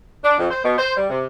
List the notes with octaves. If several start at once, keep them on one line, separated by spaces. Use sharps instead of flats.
D4
F2
C5
B2
C5
G3
C3